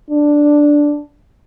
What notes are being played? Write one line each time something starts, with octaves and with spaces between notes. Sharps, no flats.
D4